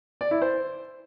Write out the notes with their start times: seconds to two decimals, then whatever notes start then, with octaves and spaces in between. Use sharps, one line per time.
0.21 D5
0.31 E4
0.42 C5